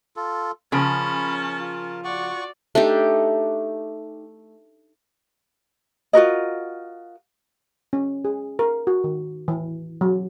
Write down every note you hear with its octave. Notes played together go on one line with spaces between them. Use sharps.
F4 A4
C#3 F3 C#4 A#4 A5 B5
F4
F#4 D5 F#5 C#6
A3 D4 D#4 G4
F4 F#4 A#4 D#5
C#4
G#4
A#4
F#4
D#3
E3
F#3